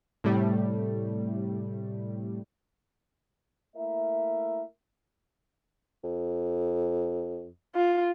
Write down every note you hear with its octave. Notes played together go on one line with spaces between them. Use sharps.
A2 C3 G3 A3
A3 A#3 E4 A#4 E5
F2
F4